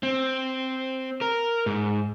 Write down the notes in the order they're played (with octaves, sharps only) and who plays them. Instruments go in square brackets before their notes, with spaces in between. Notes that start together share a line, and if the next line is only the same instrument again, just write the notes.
[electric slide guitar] C4
A#4
G#2